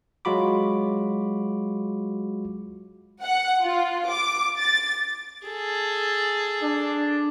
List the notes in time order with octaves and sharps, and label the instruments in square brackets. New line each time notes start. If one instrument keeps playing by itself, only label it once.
[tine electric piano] F#3 G#3 F4 F#4 B5 D6
[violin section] F#5
F4
D6
A6
[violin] G#4 A4
[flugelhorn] D4